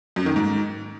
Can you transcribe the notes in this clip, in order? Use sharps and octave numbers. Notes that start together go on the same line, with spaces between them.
F#2
D#3
G#2